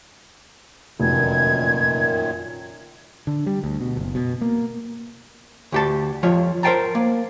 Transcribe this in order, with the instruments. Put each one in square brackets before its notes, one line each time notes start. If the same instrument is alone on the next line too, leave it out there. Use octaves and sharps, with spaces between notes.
[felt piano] F1 [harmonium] F#2 A#2 D#3 [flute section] G#6
[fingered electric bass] D3
G3
D2
B2
F#1
B2
A#3
[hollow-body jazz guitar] D2 G4 A5
F2 F3 C#5 F5
A#4 C5 F5 G5 A5 A#5
A#3